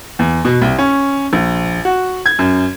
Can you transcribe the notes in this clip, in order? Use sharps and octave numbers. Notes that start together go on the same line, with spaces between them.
E2
B2
C2
C#4
A#1
F#4
G#6
F#2